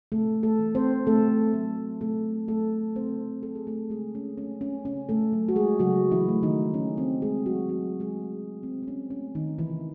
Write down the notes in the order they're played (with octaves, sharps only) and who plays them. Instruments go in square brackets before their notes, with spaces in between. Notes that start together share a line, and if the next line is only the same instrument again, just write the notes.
[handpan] C3 A3 A4
A3 A4
E3 A3
C4 C5
C3 A3 A4
F#3 A3
C3 A3 A4
F#3 A3 A4
C#3 C4 C5
F#3 A3 A4
G#4
A3 A4
C#3 G#3 G#4
C#4
F#3 A3 C#4
C#4
C#3 C#4
A3 A4
F#3 A3
F#4
G#3 G#4
C#3 F#3 F#4
E3 E4
F#3 A3
D#3 D#4
D#3 C#4
C4
G#3 A3 G#4
F#3 F#4
D#3 F#3 F#4
G#3 G#4
A3
C3 C4
C4
C#4
F#3 C#4
A3
D#3 D#4
C3 E3 E4